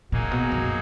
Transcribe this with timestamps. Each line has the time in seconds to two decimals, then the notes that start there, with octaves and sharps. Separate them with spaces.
0.12 A#2 F#3 A#3 D#4 G#4
0.31 B2
0.52 F#2